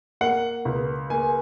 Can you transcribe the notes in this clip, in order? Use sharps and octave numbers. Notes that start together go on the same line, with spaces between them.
A#3 F#5
C#2
A#3 G#5